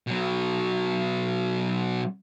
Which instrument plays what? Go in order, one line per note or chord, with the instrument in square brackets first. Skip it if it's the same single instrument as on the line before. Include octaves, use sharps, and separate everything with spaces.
[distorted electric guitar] B2 F#3